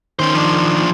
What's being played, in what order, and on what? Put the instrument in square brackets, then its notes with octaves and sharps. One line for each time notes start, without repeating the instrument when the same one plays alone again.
[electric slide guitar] D#3 [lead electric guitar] C#4 C5
[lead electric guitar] F3 D4